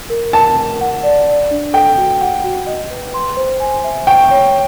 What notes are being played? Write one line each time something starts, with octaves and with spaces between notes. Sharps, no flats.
A#4
A#4 A5
A#4
F#5
D5
D5
D4
A4 G5
F#4
F#5
F#4
D#5
B4
C6
C5
G#5
E5
G5 C#6
C#5